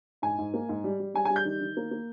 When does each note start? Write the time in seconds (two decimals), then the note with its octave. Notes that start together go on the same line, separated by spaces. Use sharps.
0.22 G#2 G#5
0.38 G#2
0.54 A#3
0.69 G#2
0.84 G3
1.00 G3
1.14 G3 G#5
1.25 G#5
1.30 G3
1.36 G6
1.45 D#3
1.61 D#3
1.77 A#3
1.91 A#3